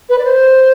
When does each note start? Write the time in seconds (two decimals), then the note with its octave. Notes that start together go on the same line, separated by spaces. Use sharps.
0.09 B4
0.18 D5
0.24 C5